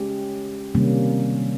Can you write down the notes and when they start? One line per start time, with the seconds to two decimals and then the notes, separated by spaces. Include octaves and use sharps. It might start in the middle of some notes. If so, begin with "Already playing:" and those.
Already playing: G#3 C#4 G4
0.75 C3 D#3 G3 A#3 C#4